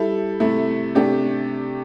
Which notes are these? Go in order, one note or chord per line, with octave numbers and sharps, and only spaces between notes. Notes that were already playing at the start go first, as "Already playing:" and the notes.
Already playing: G3 E4 A4
C3 A3 E4
C3 A3 D4 G4